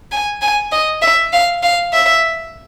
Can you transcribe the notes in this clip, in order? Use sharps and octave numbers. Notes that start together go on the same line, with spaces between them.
G#5
G#5
D#5
E5
F5
F5
E5